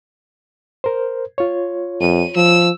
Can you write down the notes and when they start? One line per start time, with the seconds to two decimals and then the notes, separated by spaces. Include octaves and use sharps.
0.84 A#4 C5
1.38 F4 C#5
2.01 F2 D#7
2.36 F3 E6